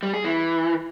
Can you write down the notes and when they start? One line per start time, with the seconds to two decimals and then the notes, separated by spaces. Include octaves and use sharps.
0.03 G3
0.13 G#4
0.24 E3